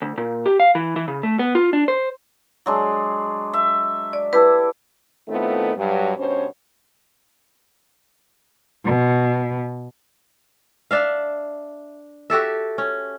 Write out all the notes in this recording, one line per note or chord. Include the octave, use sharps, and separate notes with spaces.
D2
A#2
G4
F5
E3
E3
C#3
A3
B3
F4
D4
C5
F#3 G#3 D4
E5
D5
E4 G4 A4 B4
A2 D#3 A3 B3 C4 F4
G2 F#3
G2 B2 C#4 C5 C#5
B2
D4 E5 F5
F#4 G4 A4 E5
C#4